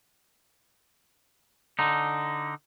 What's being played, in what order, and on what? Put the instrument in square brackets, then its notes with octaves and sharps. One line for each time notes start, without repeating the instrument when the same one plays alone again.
[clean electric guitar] D3 D#4